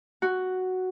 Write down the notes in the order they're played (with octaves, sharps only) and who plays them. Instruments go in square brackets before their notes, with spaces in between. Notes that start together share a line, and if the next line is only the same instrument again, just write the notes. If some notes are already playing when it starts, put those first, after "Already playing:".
[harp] F#4